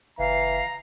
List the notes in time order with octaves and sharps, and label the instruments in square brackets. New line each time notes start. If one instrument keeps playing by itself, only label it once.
[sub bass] F#1 [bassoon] E3 [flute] F5 [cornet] A#5